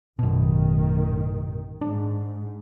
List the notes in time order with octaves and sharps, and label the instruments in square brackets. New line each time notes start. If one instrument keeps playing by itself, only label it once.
[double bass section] A1 D#3 [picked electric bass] F#2 B2
[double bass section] G#2 [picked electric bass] D4